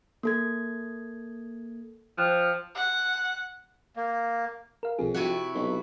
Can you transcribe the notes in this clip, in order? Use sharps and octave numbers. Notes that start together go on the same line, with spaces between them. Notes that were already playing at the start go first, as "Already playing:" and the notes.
A#3 A4 G#6
F3 C5 G5 F#6
F#5
A#3
A#4 F5
B1 F2 G#4
C3 E4 F#4 F#5
B1 C#5